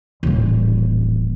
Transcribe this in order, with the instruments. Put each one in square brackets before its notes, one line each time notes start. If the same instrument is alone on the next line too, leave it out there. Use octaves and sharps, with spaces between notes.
[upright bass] D#1 A1